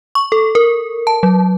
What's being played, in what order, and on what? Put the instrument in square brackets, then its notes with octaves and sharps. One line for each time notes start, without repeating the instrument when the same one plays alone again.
[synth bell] C#6
A4
A#4
A5
F#3